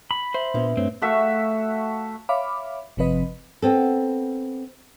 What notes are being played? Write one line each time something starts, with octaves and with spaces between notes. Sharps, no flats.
B5
C5 E5
A#2 B3 D4 B4 E5
G2 A3 C4 C#5
A3 F#4 E5 F5
C#5 E5 F5 B5 D6
G1 C3 F3 C4 B4 D#5
B3 C4 A4